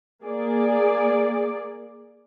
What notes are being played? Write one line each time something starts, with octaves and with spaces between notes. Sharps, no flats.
A#3 G#4 D5